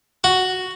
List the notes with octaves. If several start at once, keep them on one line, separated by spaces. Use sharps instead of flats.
F#4